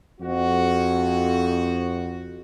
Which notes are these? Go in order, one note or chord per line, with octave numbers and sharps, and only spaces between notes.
F2 F#4